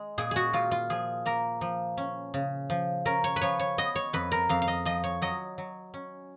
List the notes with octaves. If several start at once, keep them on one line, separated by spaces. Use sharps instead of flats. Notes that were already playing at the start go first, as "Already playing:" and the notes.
Already playing: G#3
A#2 G#4
F#4 G#4
A#2 F4
F4
F3 G#4
A#3 A#4
F3
C#4
C#3
F3
C#4 A#4
C#5
B4
F3 C#5
C#5
B3 D#5
C#5
F2 B4
A#4
F2 F5
F5
D#5
F3 D#5
C#5
F#3 D#5
F#3
C#4